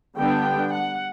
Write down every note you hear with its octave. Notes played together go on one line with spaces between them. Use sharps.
D3 G3 B3 D4 G5
F#5